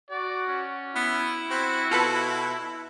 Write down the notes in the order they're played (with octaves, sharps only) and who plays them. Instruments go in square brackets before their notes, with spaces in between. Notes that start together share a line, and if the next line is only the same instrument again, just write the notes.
[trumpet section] F#4 [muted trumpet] D5
[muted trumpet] C#4
[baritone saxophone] B3 [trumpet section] E4
[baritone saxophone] C4 [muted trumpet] F#4
[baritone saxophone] B2 [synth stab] F4 A4 B4